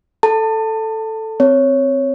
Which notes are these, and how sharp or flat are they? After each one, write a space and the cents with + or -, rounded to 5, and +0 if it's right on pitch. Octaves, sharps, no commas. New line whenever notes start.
A4 +0 A5 +25
C4 -5 C#5 +0